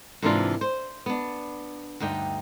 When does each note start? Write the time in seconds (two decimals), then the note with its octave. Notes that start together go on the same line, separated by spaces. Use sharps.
0.22 G#2 C3 E3 A#3 D4 F4
0.61 C5
1.06 B3 D4
2.00 D2 G2 D#4 G5